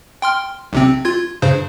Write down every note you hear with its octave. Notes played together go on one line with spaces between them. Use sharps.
G5 C6 F6
B1 C3 C4
F4 G#6
G2 C#3 C5